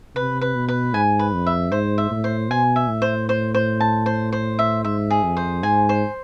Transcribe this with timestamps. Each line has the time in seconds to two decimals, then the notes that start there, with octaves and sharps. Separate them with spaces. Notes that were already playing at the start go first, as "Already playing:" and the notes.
0.15 C3 B4
0.41 B4
0.55 B2
0.68 B4
0.94 G#2 G#5
1.19 B4
1.34 F2
1.46 E5
1.72 G#2 C5
1.98 E5
2.11 A2
2.24 C5
2.50 B2 G#5
2.76 E5
2.89 A2
3.02 C5
3.29 C5
3.54 C5
3.80 A5
4.06 C5
4.32 C5
4.59 E5
4.84 G#2 E5
5.10 G#4
5.24 F2
5.37 C5
5.63 G#2 G#5
5.89 C5